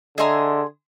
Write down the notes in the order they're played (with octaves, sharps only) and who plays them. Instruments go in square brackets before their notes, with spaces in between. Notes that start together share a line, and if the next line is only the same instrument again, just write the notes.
[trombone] D3 [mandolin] G#4 C6 [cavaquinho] D#5 E5 A#5